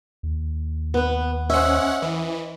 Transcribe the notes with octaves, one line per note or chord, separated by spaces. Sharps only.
D#2
B3 B4
C#4 C5 D#5 E5 F#5
E3